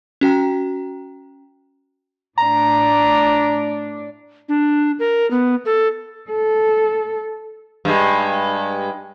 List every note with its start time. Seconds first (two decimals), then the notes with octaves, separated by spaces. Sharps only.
0.21 C#4 F#4 G5 A#5
2.38 A2 D4 D5 A#5
4.49 D4
4.99 A#4
5.31 B3
5.65 A4
6.31 A4
7.85 G2 G#3